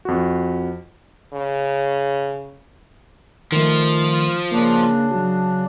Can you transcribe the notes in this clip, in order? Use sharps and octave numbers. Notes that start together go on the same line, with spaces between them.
F2 F#4
C#3
D#3 F3 A3
C#3 A#3 D4
F#3 F#4